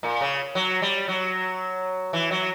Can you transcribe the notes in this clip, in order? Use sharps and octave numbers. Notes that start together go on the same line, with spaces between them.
A#2
C#3
F#3
G3
F#3
E3
F#3